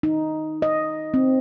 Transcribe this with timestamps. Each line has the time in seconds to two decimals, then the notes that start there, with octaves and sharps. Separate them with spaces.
0.03 D#4
0.62 D#5
1.14 C4